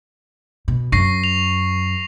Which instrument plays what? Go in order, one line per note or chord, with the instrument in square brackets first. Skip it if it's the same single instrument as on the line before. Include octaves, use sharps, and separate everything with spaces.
[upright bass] B2
[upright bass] F#2 [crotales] C#6 A#6 C7
[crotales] F7